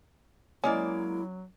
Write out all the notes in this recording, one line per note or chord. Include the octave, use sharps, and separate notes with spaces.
F#3 G#3 A#3 C#4 E4 D5